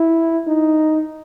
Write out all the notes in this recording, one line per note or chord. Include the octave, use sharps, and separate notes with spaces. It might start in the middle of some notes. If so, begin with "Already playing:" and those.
Already playing: E4
D#4